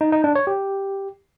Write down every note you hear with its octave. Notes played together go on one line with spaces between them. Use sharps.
D#4
D#4
D4
C#5
G4